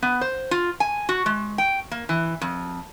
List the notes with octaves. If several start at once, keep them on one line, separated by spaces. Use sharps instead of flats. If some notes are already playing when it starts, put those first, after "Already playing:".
B3
C5
F4
G#5
F#4
G#3
G5
A#3
E3
F2